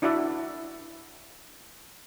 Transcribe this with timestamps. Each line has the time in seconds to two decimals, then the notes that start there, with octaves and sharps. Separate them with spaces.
0.02 D4 E4 F#4 D5 E5 F#5